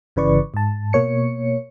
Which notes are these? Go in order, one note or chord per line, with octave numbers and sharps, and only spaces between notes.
G1 C#3 E3 B4 D5 C#6
G#2 A5
B2 A#3 C#5 C#7